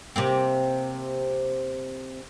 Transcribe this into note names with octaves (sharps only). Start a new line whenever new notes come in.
C3 A#3 C4